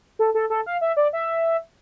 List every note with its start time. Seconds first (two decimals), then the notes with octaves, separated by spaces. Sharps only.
0.19 A4
0.34 A4
0.50 A4
0.66 F5
0.81 E5
0.97 D5
1.13 E5